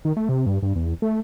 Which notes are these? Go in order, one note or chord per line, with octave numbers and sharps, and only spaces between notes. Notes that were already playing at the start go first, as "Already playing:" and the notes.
D#3
A3
C3
G2
G2
E2
A3